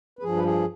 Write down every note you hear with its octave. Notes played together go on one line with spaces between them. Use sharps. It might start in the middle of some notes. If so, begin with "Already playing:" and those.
B4
G2 F3 G#4
B4
G#4